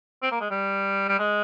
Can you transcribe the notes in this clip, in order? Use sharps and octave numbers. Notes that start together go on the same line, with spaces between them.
C4
A#3
G#3
G3
G3
G#3